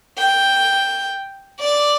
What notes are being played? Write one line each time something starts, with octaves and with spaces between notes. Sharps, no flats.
G5
D5